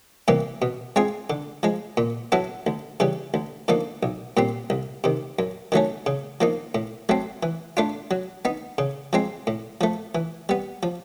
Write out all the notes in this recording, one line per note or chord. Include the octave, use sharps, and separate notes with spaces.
C3 E3 G3 A#3
B2
G#3 C4 F4 G#4
D3
F3 G#3
A#2
F#3 B3 E4 A4
D2
C#3 E3 G3
D2
D3 F3 A#3 D#4
B1
A#2 G3 C4
C2
C3 D#3
F#2
D#3 F#3 A3 C#4
C#3
F3 A#3 D#4
A2
F#3 A3 C4
E3
A3 D4 F4
F#3
B3 D#4
C#3
F3 G#3 C4
A2
F3 A3
E3
G3 B3
F3